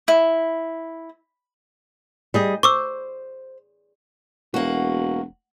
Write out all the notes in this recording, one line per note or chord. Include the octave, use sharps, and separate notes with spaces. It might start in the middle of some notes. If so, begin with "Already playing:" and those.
E4
G3 G#4 D#5
C5 C#6 D6 E6
E1 A#3 F#4